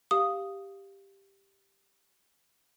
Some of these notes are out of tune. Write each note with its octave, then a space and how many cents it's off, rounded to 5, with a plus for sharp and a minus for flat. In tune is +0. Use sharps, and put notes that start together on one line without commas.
G4 +0 F5 +0 D#6 +0